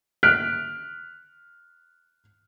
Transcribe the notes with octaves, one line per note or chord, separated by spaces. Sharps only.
F6 F#6 B6 D7